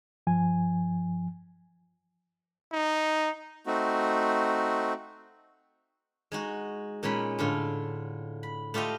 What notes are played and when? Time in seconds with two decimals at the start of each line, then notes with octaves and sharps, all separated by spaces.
0.27 G2 F3 G#5
2.73 D#4
3.67 A3 C4 D#4 F#4
6.32 G#3 D#4 F#4
7.03 A#2 G#3 C#4 D#4 B5
7.39 A2 D3 F4
8.43 B5
8.74 A3 F4 G4 A4 D#5 F5